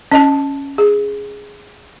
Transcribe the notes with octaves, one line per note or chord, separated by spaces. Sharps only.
C#4 D#5 A5
G#4